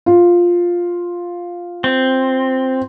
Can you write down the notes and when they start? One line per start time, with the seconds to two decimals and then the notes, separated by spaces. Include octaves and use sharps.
0.06 F4
1.84 C4